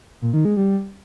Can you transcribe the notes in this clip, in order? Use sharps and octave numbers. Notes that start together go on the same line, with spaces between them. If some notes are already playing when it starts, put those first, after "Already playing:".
A#2
D#3
G#3
G3